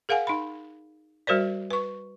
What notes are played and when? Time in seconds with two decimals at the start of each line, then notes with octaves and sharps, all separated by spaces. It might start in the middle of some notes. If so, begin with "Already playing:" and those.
0.09 G#4 A#4 F5 F#5 G#5
0.27 D#4 B5
1.27 G3 F#4 A#4 C5 D5
1.71 B4 C#6